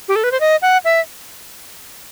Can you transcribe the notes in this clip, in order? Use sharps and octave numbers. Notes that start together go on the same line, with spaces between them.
G4
A4
B4
C5
D#5
F#5
E5